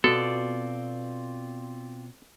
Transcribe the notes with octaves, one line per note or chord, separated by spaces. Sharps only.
B2 B3 C4 F4 F#4 A4 D5